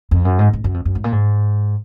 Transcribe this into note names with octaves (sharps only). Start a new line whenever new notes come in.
F2
F#2
G#2
G#2
F#2
F2
F#2
G#2
A#2
G#2